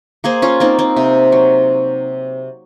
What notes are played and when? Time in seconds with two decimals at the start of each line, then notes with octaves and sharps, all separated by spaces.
0.24 A#3 G#4 C5
0.42 C#4 F4
0.60 A#3 C4 D#4
0.79 C4
0.97 C3
1.32 F#3